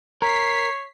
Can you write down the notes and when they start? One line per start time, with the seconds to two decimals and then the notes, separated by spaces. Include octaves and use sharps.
0.22 A#4 C#5 B6 C7